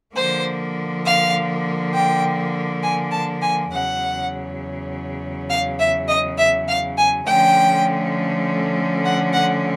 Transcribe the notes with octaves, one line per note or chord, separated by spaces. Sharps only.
D3 F3 A#3 C5
F5
G5
G#5
A5
G#5
E2 C#3 F#3 F#5
F5
E5
D#5
E5
F5
G#5
D3 F3 A3 C#4 G5
F#5
F#5